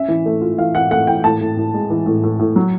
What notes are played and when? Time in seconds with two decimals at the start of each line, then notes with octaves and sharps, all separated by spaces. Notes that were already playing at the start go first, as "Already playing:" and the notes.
Already playing: C#4 E5
0.08 E3
0.26 A3
0.41 F4
0.58 E3 F5
0.75 E3 F#5
0.91 A3 F#5
1.07 E3 G5
1.24 A2 A5
1.41 A2
1.57 A2
1.74 G#3
1.90 E3
2.06 A2
2.23 A2
2.39 A2
2.56 F#3